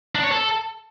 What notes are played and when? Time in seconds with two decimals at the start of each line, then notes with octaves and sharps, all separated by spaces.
0.15 D4
0.23 C#5
0.32 A4